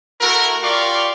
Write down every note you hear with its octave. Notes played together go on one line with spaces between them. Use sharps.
A3 E4 F#4 A#4
F4 G4 D5 F5 C6 C#6